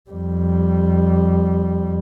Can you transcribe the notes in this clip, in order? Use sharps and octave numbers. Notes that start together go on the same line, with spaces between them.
F2 G3